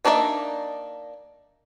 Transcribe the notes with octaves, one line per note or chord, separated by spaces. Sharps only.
A#3 D4 D#4 D5 E5